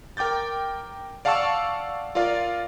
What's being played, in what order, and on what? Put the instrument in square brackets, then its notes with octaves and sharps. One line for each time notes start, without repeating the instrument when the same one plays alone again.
[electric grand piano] A#4 G5 D6 G6 A6
D5 F5 F#5 A5 C#6 E6
F4 A#4 D5 F5